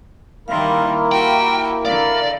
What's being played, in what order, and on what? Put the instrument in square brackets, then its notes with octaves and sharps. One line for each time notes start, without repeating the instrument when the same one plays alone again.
[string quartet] D#3 G3 [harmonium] A#3 E4 A#4 [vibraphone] F5 C6
[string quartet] F#4 G4 [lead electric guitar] G5
[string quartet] D3 [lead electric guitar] D5 [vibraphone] F5